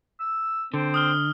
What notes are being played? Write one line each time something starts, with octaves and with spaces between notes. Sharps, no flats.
E6
D3 C4
D#6 F6 G7